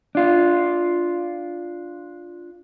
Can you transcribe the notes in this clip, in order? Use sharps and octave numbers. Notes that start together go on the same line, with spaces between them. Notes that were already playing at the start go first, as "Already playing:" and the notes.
D4 F4